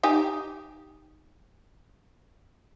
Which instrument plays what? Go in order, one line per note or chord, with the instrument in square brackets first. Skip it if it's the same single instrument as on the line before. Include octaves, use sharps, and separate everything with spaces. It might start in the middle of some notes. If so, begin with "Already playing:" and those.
[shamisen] D#4 G4 G#5